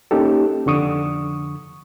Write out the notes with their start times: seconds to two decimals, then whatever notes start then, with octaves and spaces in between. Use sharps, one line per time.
0.11 A#3 C#4 D#4 G4 A4
0.66 F2 D3 C#6 D#6